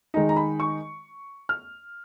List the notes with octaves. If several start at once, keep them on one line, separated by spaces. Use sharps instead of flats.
D#3 G#3 D#4 A#5
A#5
B5
C#6
F6